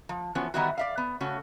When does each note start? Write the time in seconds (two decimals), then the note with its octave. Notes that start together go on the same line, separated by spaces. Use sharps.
0.09 F3
0.35 E3 F3 B3 C#4 F#4
0.54 D#3 E3 G3 B3 E4 F#4
0.78 D5 E5 F5
0.97 B3
1.20 C#3 A3 C#4 F#4